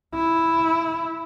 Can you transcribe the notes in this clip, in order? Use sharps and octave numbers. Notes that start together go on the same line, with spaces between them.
E4